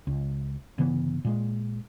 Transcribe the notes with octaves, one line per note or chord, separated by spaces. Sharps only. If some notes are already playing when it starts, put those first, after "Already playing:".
C#2
G1 C#3 E3 B3
A#2 G#3